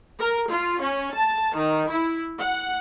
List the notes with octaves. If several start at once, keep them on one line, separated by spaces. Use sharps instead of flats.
A#4
F4
C#4
A5
D#3
E4
F#5